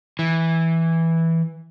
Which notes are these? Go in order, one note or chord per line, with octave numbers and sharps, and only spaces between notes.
E3